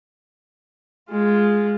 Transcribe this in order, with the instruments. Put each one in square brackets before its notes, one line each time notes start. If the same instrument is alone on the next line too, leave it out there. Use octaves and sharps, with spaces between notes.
[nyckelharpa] G#3 F4